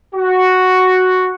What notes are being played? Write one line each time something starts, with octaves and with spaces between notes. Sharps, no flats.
F#4